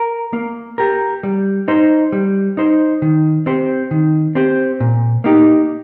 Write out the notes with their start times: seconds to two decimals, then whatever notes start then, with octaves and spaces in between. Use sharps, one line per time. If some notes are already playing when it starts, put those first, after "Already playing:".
Already playing: A#4
0.33 A#3
0.78 G4 A#4
1.23 G3
1.68 D#4 C5
2.12 G3
2.57 D#4 C5
3.02 D#3
3.46 C4 G4 C5
3.91 D#3
4.35 C4 G4 C5
4.80 A#2
5.24 A#3 D#4 G4